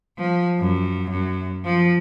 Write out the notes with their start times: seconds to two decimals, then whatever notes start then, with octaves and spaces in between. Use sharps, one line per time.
0.18 F3
0.60 F#2
1.10 F#2
1.65 F3